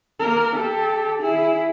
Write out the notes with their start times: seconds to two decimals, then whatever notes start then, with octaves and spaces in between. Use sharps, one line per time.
0.19 A#3 A#4
0.56 G4 A4
1.21 E4 G#4